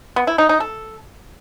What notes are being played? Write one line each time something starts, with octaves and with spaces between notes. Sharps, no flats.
B3
E4
D#4
D#4
A4